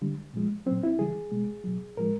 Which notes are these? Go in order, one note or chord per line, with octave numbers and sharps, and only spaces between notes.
D3 G3
A#2 F3 G#3
A#2 F#3 C4
E4
C#3 E3 G3 G#4
B2 G#3
B2 F#3
A2 F3 G#3 A#4